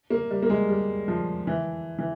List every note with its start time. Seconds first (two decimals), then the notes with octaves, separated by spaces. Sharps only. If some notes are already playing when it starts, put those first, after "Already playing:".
0.10 A#3
0.31 G3
0.43 A#3
0.50 G#3
0.69 G3
1.08 F3
1.47 E3
1.99 E3